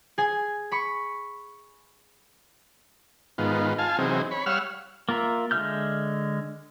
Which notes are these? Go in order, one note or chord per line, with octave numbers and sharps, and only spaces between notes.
G#4 G#5
B5 C#6
G#2 D#3 B3 F4
F4 F5 G#5 A5
C3 E3 F#3 C4 D#4 G#4
C#5 B5
G3 C#5 F5 F#5 E6 F6
A#3 F4 A#4 E5
D3 G#3 E5 F6 G6